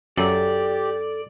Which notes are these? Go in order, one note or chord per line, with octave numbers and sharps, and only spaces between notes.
F#2 G4 A4 D5